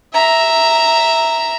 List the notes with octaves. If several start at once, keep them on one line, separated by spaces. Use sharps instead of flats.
E5 A#5